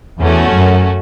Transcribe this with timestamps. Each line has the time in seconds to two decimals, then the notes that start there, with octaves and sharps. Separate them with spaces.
0.19 E2 A3 C#4 F#4
0.53 F#2